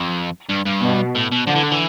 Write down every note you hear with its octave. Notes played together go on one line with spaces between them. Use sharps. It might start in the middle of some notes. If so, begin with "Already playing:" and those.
Already playing: F2
G2
G2
B2
A2
B2
D3 F3
E3
D3
E3